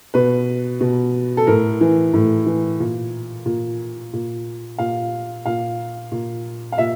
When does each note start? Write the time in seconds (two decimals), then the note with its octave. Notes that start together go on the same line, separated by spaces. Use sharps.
0.14 B2 B4
0.80 B2
1.37 A4
1.47 A2 A#4
1.81 E3
2.14 A2
2.46 E3
2.80 A#2
3.46 A#2
4.13 A#2
4.78 A#2 F5
5.46 A#2 F5
6.12 A#2
6.72 F5
6.78 A#2 E5